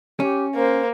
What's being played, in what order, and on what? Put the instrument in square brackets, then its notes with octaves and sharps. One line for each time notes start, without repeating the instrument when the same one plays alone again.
[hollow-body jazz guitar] C#4 [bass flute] G4
[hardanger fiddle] A#3 [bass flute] C5